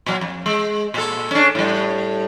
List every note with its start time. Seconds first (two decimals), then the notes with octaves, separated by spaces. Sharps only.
0.06 A#2 F#3
0.21 F2
0.46 G#3
0.94 A#2 A4
1.31 C#4 D4
1.55 A2 G3